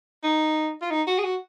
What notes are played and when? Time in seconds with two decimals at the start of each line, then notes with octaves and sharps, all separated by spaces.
0.24 D#4
0.82 F4
0.90 D#4
1.07 F#4
1.19 G#4
1.24 F#4